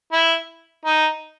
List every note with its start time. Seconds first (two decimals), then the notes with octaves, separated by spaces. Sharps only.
0.12 E4
0.85 D#4